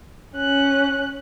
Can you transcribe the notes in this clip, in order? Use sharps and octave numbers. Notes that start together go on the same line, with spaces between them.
C#4 F#6